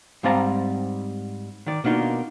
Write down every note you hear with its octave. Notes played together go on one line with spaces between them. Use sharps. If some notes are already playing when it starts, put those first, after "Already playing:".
G#2 G3 C4 F5 A5 A#5
D#3 D5
B2 A#3 D4 D#4 F4